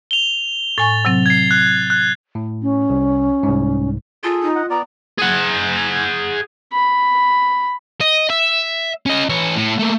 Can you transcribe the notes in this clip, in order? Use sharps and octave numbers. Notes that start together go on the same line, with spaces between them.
F7 G7
A2 G#5 C#6 A6
C3 F#3 C4
G#6 C7
F#6
F#6
A2
C#4
C2
C2 G#2
F4 G#4 A4
D#4
D#5 F#5
B3 D5 A#5
G#4 F#5
B5
D#5
E5
C#4 D#5
E3 C#5
A2
A3 A#3